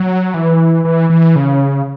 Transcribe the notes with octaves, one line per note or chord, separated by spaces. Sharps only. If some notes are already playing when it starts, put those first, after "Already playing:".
Already playing: F#3
E3
E3
E3
C#3